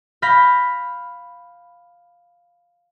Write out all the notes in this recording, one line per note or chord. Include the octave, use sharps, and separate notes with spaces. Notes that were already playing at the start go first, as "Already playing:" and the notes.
F5 B5 G6 A#6 B6